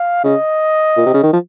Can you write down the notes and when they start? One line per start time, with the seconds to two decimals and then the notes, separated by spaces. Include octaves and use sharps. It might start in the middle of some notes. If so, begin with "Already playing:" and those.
Already playing: F5
0.24 C#3 D#5
0.97 A#2
1.06 C3
1.14 C#3
1.23 D#3
1.33 F3